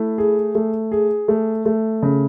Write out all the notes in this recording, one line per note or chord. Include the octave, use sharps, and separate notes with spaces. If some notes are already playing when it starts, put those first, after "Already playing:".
Already playing: A3 E4
G#4
A3
G#4
A3
A3
C#3